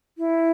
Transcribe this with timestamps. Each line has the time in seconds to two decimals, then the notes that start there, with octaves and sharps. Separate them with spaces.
0.18 E4